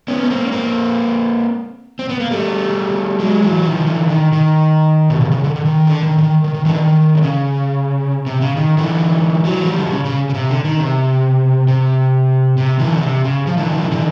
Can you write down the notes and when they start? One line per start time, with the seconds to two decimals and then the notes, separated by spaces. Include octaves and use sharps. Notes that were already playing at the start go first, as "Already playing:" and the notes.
0.08 B3 C#4
0.23 B3
0.30 A#3 C4
0.47 C#4
0.52 A#3 C4
1.99 C4
2.09 B3
2.20 A#3
2.31 G3 A3
3.20 F#3 G#3
3.42 E3 F#3
3.65 D#3 F3
3.76 D#3
3.87 D3 E3
4.09 D#3
4.32 D#3
5.10 B2
5.21 C3
5.31 C#3
5.44 D3
5.56 D3
5.65 D#3
5.87 D3
6.03 D#3
6.18 D#3
6.44 D#3
6.54 D#3
6.65 D3 E3
6.77 D#3
7.15 C3
7.22 C#3
8.27 C3
8.41 C#3
8.56 D#3
8.78 D3 E3
9.45 E3 F#3
9.67 F3 G3
9.78 D3
9.90 C#3
10.05 C#3
10.29 C#3
10.34 C3
10.50 D3
10.64 D#3
10.79 C3
11.68 C3
12.58 C3
12.79 D3 E3
12.98 C#3
13.01 C3
13.24 C#3
13.47 F3
13.58 D3 E3
13.69 D#3 F3
13.80 D3 E3
13.91 D3 E3